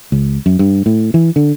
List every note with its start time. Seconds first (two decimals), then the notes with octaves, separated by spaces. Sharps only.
0.12 C#2
0.46 F#2
0.59 G2
0.86 A2
1.14 E3
1.36 D3